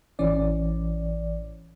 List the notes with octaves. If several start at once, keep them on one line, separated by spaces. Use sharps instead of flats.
A1 E3 C#4 D5